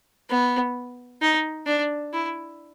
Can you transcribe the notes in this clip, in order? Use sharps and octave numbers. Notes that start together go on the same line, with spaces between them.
B3
D#4
D4
E4